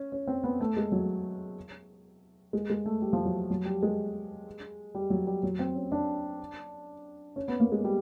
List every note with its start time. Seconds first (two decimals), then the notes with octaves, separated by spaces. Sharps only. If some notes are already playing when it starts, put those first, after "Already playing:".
Already playing: C#4
0.12 C#4
0.27 C4
0.44 B3
0.60 A3
0.77 G#3
0.92 F#3
2.53 G#3
2.70 G#3
2.86 A3
3.02 G3
3.13 F3
3.25 F#3
3.50 F#3
3.65 G3
3.83 G#3
4.95 G3
5.10 F#3
5.27 G3
5.43 F#3
5.59 C4
5.75 C#4
5.92 D4
7.36 C#4
7.48 B3
7.60 A#3
7.72 G#3
7.84 G3